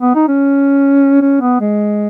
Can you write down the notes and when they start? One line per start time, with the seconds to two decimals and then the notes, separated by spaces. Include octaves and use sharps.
0.01 B3
0.15 D#4
0.28 C#4
1.22 C#4
1.41 B3
1.61 G#3